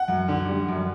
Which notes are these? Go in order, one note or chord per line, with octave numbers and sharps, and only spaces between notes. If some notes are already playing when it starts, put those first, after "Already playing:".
Already playing: F#5
F#2
D3
G3
F#2